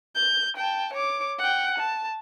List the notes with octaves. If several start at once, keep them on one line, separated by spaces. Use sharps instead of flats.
G6
G5 A5
C#5 D6
F#5 G5
A5